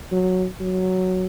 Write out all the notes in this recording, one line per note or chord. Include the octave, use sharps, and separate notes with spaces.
F#3
F#3